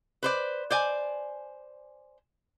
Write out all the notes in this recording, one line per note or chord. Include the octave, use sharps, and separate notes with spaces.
B4 C5 D5
C5 D5 G#5